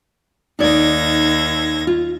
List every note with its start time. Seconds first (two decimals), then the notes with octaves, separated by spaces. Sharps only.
0.59 D#2 D#4 D5 G#6 A#6
1.87 F4